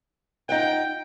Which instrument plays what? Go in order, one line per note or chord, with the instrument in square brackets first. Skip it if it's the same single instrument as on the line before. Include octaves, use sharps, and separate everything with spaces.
[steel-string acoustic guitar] D#4 F4 F#5 [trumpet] G5